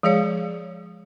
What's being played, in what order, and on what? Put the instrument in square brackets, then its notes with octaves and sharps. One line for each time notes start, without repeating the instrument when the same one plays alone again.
[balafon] F3 G#3 G#4 C#5 F5